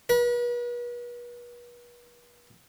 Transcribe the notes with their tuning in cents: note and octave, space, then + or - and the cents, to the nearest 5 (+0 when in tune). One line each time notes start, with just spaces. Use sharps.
B4 -40